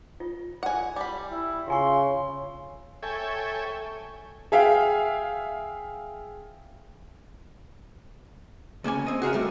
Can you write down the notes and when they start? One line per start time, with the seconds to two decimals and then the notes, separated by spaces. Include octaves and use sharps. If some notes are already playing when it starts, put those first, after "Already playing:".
0.20 F4
0.63 F#5 G#5
0.96 G3 B5
1.31 E4
1.68 C#3 F4 G#5 C6 C#6
3.03 A4 C#5 E5 G5 G#5
4.52 G#4 E5 F5 G5
8.84 C#2 A#3 C#4 G#5
9.06 C4 D#5
9.22 F#4 G#4 A#4 E5
9.33 A#2 G3 A3